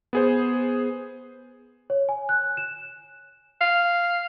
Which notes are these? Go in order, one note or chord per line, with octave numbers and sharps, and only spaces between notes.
B3 G#4 C5
C#5
G#5
F#6
E7
F5